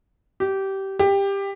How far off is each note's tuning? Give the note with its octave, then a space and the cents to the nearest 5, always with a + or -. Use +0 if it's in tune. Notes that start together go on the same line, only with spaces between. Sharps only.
G4 -20
G4 +15